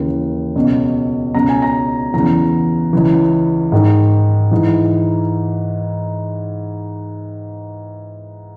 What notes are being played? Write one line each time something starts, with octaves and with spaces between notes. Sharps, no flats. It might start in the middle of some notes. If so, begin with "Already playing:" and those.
Already playing: D#2 C#3 E3
C#2 B2
C#2 B2 A#5
G#5
A#5
E2 C#3 E3 A#5
C#2 C#3 E3
G#2 D#3
G#2 E3